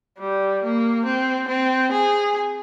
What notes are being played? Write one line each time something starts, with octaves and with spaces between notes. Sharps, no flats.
G3
A#3
C4
C4
G#4